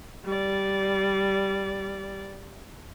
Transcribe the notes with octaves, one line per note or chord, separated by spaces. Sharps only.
G3 D5